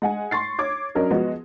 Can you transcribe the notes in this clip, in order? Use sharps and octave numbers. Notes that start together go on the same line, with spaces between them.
G#3 F#5 G#5
C6 C#6 A6 C7
C#5 D6 G#6
F#3 C#4 D4 A#4 D#5
F3 G#3 B3 F#4